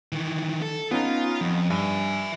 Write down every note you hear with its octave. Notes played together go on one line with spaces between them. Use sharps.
D#3 E3
A4
B3 C#4 D#4 F4
F2
G2 E5 G#5